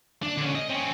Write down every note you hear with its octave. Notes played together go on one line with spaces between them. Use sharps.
D4
D3 C#4
D#5
C4 C#4